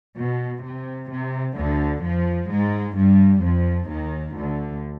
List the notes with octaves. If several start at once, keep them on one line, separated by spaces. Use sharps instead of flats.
B2
C3
C3
D2 D3
F2 F3
G#2 G#3
G2 G3
F2 F3
D#2 D#3
D2 D3